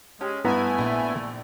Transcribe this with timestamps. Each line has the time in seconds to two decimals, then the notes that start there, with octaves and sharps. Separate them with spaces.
0.21 G#3 C#4 G4
0.45 G2 A3 B3 E4 G#5 A#5
0.78 A#1